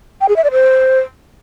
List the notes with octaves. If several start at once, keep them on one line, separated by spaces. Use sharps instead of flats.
G5
G#4
E5
D5
C5